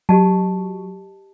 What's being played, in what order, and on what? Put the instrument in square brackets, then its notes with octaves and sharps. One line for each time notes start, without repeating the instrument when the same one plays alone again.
[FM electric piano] F#3 [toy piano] G4 D#5 A5